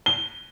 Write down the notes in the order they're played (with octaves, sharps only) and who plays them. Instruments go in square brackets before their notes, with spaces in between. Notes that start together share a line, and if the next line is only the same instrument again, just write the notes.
[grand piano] G7